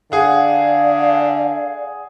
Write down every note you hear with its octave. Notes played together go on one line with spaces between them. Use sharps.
D3 G#4 D5 F5 F#5